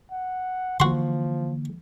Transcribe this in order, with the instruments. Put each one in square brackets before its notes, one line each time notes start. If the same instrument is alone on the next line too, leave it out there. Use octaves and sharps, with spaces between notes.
[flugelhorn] F#5
[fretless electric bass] D3 E3 A#3 [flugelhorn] F3 [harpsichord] F#4 C6